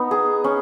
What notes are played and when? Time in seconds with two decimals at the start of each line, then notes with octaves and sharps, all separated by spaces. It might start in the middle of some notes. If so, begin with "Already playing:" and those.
Already playing: B3 D#4
0.11 G#4
0.44 C#4